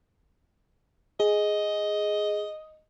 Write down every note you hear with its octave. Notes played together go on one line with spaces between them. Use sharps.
G#4 D#5